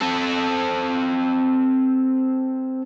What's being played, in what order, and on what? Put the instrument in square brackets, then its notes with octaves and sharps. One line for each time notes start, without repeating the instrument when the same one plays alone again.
[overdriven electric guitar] C4 A4